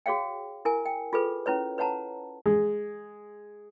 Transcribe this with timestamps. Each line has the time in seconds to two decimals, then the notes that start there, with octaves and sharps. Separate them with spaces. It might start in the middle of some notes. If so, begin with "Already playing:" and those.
0.06 F#4 G#4 C#5 F5 G5
0.65 E4 A#4 G#5
0.86 G5
1.13 F4 G#4 A4 B4
1.46 C#4 E4 B4 C#5
1.78 B4 C#5 F#5 A5 A#5
2.46 G#3